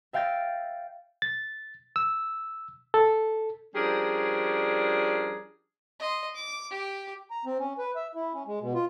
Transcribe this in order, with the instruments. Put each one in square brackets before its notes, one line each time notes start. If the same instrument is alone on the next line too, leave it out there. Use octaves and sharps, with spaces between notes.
[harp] E5 F5 G5 G6 A6 A#6
[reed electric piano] A6
E6
A4
[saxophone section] F3 G3 C#4 D4 G#4 A#4
[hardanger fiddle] D#5 C6
D6
G4
[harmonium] A#5
C4
C#4
B4
E5
E4
C#4
G#3
B2
F4